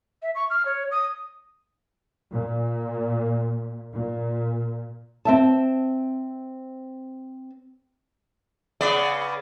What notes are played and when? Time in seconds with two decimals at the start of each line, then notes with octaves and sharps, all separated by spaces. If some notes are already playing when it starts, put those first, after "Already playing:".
0.22 E5
0.35 C#6
0.50 F6
0.66 C#5
0.91 D#6
2.32 A#2
3.93 A#2
5.25 C4 E5 A5
8.81 C#3 B3 D5